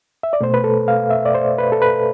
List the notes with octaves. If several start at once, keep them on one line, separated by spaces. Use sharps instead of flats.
E5
D5
B2 A3 C5
B4
A4
F5
E5
D5
C5
B4
A4
B4